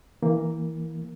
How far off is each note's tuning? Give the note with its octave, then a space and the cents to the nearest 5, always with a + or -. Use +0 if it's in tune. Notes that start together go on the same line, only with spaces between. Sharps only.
E3 -20 A#3 +0